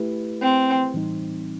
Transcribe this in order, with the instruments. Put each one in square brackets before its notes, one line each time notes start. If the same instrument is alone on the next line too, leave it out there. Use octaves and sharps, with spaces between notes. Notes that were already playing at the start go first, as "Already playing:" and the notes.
Already playing: [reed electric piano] A3 E4 G4 B4
[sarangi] C4
[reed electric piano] A2 E3 G3 C4 D#4